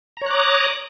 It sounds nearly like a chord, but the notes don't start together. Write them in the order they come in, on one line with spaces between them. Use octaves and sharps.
A#5 C#5 F#6 D6 D#6